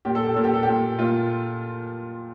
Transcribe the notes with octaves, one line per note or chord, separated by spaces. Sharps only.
A#2 G4
A4
G4
A#2 A4
G4
A4
A#2 G4
A#2 F4